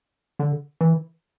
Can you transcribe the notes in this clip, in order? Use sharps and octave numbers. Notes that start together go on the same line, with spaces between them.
D3
E3